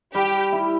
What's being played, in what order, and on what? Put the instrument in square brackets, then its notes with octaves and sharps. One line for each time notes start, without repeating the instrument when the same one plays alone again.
[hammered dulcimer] G3 [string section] G4
[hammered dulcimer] E4